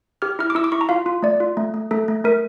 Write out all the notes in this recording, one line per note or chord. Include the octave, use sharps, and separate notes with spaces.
G4 F6
E4 F6
D6
E4 E6
D6
E4 C#6
A#5
F4 F5
F4
A3 D5
F4
A3
A3
A3 A4
A3
A3 A#4